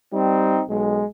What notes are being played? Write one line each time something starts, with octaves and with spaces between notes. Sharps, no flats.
G3 C4 D#4
B1 G#3